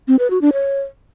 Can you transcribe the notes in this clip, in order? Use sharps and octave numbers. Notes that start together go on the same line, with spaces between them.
C4
B4
F#4
D4
C#5